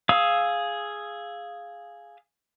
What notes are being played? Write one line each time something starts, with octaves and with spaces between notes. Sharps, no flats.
G#4 F5 D#6 E6